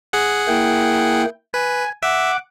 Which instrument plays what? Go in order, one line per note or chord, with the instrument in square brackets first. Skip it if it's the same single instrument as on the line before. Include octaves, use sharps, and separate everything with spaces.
[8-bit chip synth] G#4 F#5
[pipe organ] A#3 E4 G5
[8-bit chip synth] B4 [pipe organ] G#5
[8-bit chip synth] E5 [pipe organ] F#5 D6